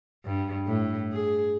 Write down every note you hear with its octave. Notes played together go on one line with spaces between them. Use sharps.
G2
A2
G#4